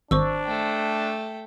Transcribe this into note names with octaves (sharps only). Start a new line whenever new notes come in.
G#1 D4 C5 C#6 E6
A3 G5